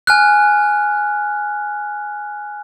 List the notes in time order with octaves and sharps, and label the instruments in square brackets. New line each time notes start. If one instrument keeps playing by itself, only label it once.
[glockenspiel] G#5 F6 F#6